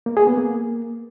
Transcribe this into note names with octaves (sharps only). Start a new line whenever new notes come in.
A#3
G#4
B3
A#3